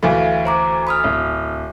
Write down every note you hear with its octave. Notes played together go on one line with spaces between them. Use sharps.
D2 E3 A3 E5 F5 B5
C5 A#5 D6
B5 D#6 F6
D1